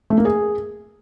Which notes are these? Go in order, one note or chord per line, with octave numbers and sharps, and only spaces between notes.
A3
A#3
G#4